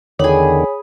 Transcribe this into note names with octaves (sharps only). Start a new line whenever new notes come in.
E2 D3 D#3 G#4 C#5 B5